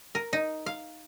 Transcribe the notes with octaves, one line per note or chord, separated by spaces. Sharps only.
A#4
D#4
F5